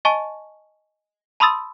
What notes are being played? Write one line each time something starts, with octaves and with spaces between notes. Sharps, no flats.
D#5 G#5 A5 C#6
A5 B5 C6 D#6 E6 A6